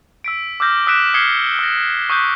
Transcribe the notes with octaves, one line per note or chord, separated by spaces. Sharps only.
E6 B6 D7
D6 E6 F6 G6 A#6
D#6 E6 F#6 B6 D7 E7
D#6 F6 G#6 C7 C#7 G7
E6 A#6
C#6 D#6 F#6 G6 B6